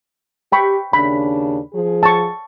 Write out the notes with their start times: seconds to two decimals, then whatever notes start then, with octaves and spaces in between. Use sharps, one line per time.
0.52 G4 G5 B5 C#6
0.93 D#2 C#3 D4 B5
1.74 F3 G#4
2.03 A5 C#6